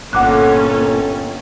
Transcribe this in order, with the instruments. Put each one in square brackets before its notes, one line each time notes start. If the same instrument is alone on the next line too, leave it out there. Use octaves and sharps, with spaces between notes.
[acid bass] G1 [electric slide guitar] A#2 [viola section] C#4 A4 [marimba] F#5 D6 F#6